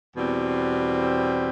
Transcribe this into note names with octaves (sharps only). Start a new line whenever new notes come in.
E2 B2 G3 C4